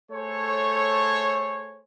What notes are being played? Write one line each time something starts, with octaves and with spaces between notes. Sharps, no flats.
A3 G#4 A4 C5 C#5